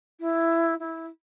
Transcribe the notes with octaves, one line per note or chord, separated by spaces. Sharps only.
E4
E4